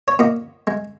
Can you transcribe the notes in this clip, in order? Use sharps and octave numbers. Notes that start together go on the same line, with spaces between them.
C#5
A#2 D#5
G#3